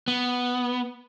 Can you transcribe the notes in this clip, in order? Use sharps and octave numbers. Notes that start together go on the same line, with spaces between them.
B3